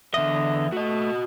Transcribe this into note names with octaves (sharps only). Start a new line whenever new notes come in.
E2 D3 D#5 E5
A3 F#4 D#5